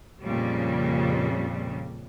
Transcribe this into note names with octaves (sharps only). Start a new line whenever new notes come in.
F2 A#2 C#3 G3